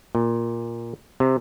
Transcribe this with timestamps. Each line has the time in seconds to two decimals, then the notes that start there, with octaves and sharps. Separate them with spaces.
0.15 A#2
1.20 C3